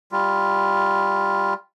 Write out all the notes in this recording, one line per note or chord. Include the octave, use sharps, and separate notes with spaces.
G3 F4